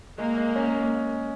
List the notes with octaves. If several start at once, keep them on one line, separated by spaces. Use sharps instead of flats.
G#3 A#3
G#3
C#4